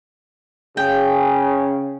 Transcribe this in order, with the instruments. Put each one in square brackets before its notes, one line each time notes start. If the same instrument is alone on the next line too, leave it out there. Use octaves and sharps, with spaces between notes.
[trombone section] C#3 [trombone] G#4 [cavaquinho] G5